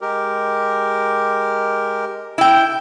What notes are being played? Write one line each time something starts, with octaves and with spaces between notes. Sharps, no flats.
G#3 G4 A#4
E4 G5